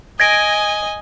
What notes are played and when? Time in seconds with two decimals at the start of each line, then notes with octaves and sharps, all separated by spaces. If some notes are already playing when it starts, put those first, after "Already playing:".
0.20 D#5 G#5 G#6 A#6 D7